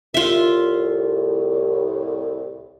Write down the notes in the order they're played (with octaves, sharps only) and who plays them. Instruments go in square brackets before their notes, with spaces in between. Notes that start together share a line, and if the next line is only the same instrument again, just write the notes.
[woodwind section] C2 A2 [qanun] F4 E5